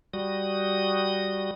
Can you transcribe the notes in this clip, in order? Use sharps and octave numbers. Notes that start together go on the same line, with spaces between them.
G3 F#4 D#6